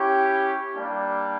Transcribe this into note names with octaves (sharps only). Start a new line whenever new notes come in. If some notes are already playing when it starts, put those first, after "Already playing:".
Already playing: C#4 E4 G4 C#5
G3 A#3 D4